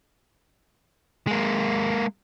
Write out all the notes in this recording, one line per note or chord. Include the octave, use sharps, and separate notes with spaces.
G#3 A#3